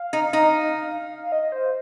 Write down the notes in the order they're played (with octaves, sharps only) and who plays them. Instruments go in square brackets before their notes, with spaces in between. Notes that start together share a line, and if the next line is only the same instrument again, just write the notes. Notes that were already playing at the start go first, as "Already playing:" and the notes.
Already playing: [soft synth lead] F5
[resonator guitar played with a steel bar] D#4
D#4
[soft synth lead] F5
D#5
C5